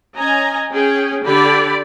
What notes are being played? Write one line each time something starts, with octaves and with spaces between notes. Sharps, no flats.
C#4 D#5 G#5 A#5
C#4 G#4 G5
D3 G4 D5 B5